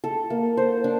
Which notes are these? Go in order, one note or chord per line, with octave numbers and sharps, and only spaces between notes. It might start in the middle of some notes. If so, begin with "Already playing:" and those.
A4
A#3
C5
D4